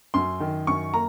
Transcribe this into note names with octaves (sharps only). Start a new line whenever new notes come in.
F#2 C6
D#3
F#2 C#6
A#3 A#5